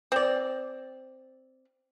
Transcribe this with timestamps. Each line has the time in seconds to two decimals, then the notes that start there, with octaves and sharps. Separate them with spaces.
0.12 C4 D5